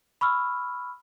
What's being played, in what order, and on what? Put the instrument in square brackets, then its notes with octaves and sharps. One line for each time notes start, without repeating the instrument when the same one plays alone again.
[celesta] B5 C#6 E6 F6